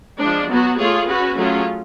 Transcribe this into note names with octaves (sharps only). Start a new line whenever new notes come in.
F3 G#3 D4
F#3 B3 F#4
A3 F4 G#4 C#5
C#4 F#4 B4
F#3 A3 C#4 F4 G#4